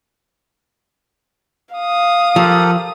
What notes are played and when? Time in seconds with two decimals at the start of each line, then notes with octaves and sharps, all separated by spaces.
1.75 F5 D#6
2.36 F3 G4 A4 A#4